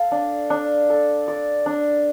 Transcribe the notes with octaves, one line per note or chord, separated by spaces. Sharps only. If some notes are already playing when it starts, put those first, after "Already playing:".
Already playing: A4 F5
D4
D4
A4
D5
D4